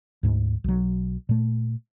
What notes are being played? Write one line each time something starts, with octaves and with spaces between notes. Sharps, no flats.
D2 G#2
B1 F#3
A#2 A3